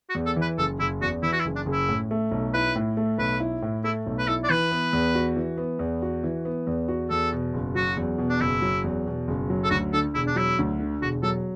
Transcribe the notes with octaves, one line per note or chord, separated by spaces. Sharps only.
F#4
E2
A4
E3 B4
F#1 A4
F#1 E4
E2 F#4
E3 E4
F#4
E4
F#1
D4
F#1
E4
A2
A3
B1
E4 B4
A2
A3
B1 B4
E4
A2
A3 E4
B1
B4
E4 A4
D5
E3 B4
B3
E2
F#4
E3
B3
E2
F#4
E3
B3
E2
F#4
E2 A4
B2
F#1
F#3 F#4
E2
B2
D4
F#1 E4
F#3
E2
B2
F#1
F#3
A4
D2 F#4
D3 A4
E1 E4
D4
F#3 E4
D2
D3
E1 F#4
F#3 A4